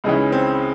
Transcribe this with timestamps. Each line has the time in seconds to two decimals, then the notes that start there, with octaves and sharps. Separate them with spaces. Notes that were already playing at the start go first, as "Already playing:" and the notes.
0.04 C#2 C#3 E3 D#4
0.32 C4